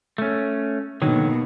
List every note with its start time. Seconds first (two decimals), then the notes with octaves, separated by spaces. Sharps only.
0.18 A3 C#4
1.02 D#2 B2 D3 D#3 F#3